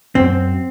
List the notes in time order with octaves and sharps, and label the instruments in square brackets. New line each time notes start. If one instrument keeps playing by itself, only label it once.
[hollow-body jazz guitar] F#2 C4